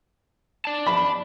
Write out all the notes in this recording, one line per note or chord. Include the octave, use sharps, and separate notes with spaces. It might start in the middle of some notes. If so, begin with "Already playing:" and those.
D5 A5
B5